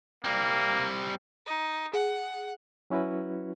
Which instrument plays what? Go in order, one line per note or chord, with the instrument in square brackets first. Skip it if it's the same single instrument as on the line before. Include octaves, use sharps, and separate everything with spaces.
[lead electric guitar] G3 C4 [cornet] A#3
[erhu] D#4
[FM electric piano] G#4 [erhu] F#5
[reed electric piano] F#3 C#4 E4 F#4 B4